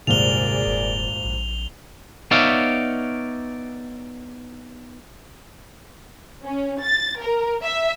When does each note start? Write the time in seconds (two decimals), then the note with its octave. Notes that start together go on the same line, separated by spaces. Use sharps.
0.07 D#1 G#1 C3 G#4 A#4 D5 F7 G7
0.66 F#1
1.25 A#1
2.31 B3 D#4 C#5 D5 E5 F5
6.46 C#4
6.82 A6
7.21 A#4
7.63 E5